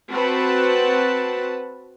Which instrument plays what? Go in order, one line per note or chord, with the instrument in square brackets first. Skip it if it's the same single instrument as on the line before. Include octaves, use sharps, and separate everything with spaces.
[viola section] C4 F#4 B4 F#5 A5